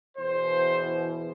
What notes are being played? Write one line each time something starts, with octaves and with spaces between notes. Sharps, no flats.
E2 B2 C5